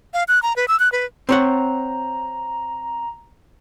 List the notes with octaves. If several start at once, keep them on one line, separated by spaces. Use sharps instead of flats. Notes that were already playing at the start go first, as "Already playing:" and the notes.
F5
F#6
A#5
B4
E6
F#6
B4
C4 C#5 F#5 A#5